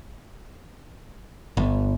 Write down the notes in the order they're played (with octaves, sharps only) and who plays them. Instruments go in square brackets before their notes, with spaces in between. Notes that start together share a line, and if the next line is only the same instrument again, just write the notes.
[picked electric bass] G1